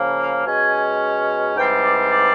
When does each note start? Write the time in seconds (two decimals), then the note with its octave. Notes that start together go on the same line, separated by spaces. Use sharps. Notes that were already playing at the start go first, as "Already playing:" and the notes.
Already playing: C#3 F3 A#3
0.20 F5
0.46 B2 G#3 C#4 G#5
1.56 G#2 E3 G3 C4 G5
1.84 D5
2.11 D5